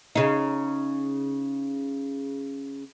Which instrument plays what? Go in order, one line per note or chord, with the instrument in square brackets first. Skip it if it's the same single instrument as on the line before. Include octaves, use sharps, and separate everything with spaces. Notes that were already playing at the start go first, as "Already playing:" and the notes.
[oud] C#3 D#4